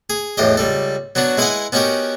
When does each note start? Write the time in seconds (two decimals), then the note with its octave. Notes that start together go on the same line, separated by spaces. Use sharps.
0.10 G#4
0.37 B1 E2 A2 G4 D#5
0.57 C#2 G3 A4
1.15 F#3 B3 D4 F#4
1.37 G#3 E4 B4 D#5 F#5 G#5
1.72 B3 C#4 D#4 F#4 G4 A#4